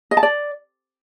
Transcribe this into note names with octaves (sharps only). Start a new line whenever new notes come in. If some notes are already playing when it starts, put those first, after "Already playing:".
D#5
A5
D5